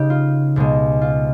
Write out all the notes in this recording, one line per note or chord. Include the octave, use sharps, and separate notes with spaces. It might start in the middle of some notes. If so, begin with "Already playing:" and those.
Already playing: C#3 D#4 G4
F4
C#2 B2 G#3
F4